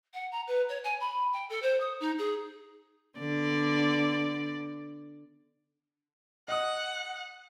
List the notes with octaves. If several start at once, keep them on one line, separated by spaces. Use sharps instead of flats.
F#5
A#5
B4
C#5
G#5
B5
G5
A4
C5
D#6
D#4
G#4
D3 B3 D5
D#5 F#5 D#6